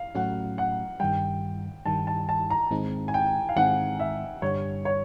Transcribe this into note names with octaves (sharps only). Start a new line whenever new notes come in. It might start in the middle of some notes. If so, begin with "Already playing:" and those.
Already playing: F5
A2 F#3 A3 C#4 F#4 F#5
F#5
G2 D#3 G3 G5
G2 D#3 G3 A5
A5
A5
A#5
G#2 D#3 G#3 C4 D#4
G#5
G5
F5
G#2 D#3 G#3 C4 D#4 F#5
E5
G2 D3 G3 C#5
C#5